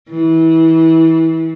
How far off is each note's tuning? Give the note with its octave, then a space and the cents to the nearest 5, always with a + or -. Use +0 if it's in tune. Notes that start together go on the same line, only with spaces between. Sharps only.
E3 -25